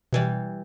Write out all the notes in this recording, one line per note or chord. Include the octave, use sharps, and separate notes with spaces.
B2 E3 G3